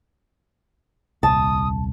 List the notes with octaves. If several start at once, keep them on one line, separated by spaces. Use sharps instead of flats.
D#1 C2 A5 D#6